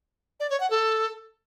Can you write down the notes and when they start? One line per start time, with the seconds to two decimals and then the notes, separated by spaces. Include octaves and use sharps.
0.40 D5
0.50 C#5
0.60 F#5
0.70 A4